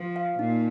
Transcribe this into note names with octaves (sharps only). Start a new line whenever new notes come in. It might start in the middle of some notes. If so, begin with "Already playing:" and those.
Already playing: F3
F5
A#2 D#4